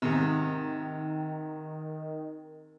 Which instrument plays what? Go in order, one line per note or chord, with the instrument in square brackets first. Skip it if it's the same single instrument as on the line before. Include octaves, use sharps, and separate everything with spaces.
[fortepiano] G#2 C3 [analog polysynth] D#3